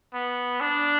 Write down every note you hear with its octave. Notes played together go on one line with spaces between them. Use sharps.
B3
D4